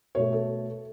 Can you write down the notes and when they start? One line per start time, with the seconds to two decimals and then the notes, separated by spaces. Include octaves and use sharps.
0.15 B2 A3 C#5
0.33 A4